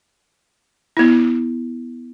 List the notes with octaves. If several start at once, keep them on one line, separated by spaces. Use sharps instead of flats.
B3 E4